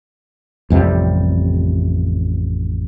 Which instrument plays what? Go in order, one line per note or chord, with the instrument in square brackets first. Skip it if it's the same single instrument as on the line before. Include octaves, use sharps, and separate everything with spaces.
[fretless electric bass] A1 F2 C3 G3